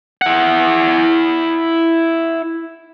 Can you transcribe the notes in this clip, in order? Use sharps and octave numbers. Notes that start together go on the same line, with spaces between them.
E4 F#5